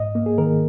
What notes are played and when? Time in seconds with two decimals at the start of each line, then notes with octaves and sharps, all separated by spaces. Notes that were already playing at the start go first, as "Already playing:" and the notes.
Already playing: G#2 D#5
0.15 A#3
0.26 G#4
0.38 D#3 A#4